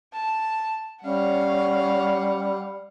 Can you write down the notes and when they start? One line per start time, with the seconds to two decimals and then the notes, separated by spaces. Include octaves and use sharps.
0.13 A5
1.04 G3 C#4 F5 F#5